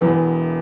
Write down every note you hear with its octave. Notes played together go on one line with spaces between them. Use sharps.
E1 E2 E3 B3 B4